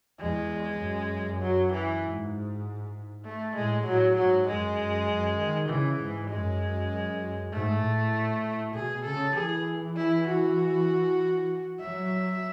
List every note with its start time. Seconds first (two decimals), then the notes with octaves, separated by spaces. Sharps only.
0.20 E2 G#3
0.80 F#2
1.41 F#3
1.72 E3
2.02 G#2
3.25 A3
3.55 A2 G#3
3.85 A2 F#3
4.16 G#2 F#3
4.47 F#2 G#3
4.78 F#2
5.08 F#2
5.39 D#3
5.69 C#3 E3
5.99 G#2
6.30 F#2 G#3
7.52 G#2 A3
7.82 A2
8.75 B2 G#4
9.05 C#3 A4
9.36 E3 G#4
9.97 E4
10.27 F#4
11.80 F#3 E5